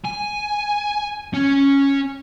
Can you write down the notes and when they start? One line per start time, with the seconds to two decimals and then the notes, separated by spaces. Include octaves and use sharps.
0.05 G#5
1.34 C#4